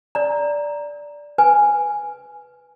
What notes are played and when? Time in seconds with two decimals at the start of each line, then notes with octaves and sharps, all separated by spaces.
0.15 D5 A#5
1.38 B4 G#5